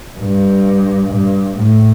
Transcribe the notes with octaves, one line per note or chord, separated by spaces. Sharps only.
G2
G2
A2